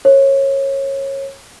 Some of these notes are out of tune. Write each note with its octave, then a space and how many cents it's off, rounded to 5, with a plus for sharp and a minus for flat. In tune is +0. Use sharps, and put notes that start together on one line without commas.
A#4 +5 C#5 -25